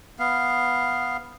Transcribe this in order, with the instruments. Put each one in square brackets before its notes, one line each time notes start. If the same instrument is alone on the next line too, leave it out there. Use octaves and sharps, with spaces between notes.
[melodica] B3 F5